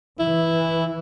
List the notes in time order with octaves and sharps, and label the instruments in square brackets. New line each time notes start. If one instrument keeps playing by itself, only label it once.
[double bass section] E3 [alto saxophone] E4